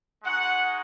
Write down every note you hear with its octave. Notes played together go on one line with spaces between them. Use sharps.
G#3 D#4 F#4 F#5